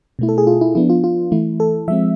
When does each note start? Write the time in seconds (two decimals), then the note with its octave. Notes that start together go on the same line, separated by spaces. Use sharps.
0.19 B2 A3 E4
0.29 A4
0.38 G#4
0.47 F4
0.61 E4
0.75 F3 B3 D4 E4
0.89 F4
1.04 F4
1.32 E3 A3 E4
1.60 A4
1.88 F3 G#3 C4 E5